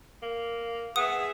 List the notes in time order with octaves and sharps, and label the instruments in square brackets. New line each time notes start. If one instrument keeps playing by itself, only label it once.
[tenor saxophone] A#3
[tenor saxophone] B3 [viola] G#4 E5 [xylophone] D#6